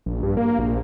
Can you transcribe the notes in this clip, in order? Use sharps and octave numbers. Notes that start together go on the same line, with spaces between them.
A#1
G2
A#3
A#1